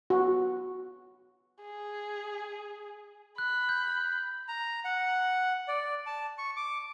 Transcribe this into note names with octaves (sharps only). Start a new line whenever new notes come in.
F#4
G#4
B5 F#6
G6
A#5
F#5
D5
A5
C#6
D6